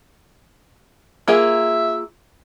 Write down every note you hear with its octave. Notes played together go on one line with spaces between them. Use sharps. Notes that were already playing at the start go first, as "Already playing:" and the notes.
A#3 F4 G#4 E5